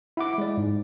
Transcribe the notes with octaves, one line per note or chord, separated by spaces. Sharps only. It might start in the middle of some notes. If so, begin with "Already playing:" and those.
E4 F#5 D6
G#3 D5
G#2